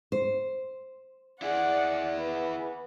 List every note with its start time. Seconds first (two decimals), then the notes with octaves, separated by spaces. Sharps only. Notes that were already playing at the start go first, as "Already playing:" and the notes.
0.12 C5
1.42 E4 G#4 D5 F#5
2.17 B3